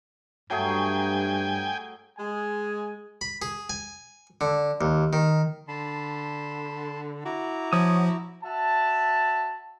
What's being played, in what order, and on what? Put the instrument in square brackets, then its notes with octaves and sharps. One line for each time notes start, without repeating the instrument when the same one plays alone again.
[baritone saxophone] G2 [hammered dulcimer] F#3 A3 G#4 [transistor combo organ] G5 G#5
[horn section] G#3 G#5
[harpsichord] B5
G#4
G#5
D3
D#2
D#3
[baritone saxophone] D3 [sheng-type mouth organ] A5 B5 C6
[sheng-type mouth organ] E4 A#5 D6 [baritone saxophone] F#4
[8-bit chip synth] F3 [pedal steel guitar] C#5 D#6
[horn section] F#4 E5 A5